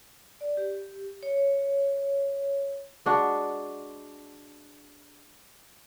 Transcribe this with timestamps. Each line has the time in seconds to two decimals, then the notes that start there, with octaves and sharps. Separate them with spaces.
0.41 D5
0.57 G4
1.23 C#5
3.06 G#3 D4 F#4